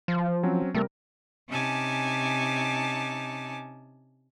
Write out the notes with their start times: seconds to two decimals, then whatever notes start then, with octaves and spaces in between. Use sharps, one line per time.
0.08 F3
0.43 F#3 C4 C#4
0.74 C3 G3 A3 A#4
1.50 C3 C#4 D#4 G#5 A5 D6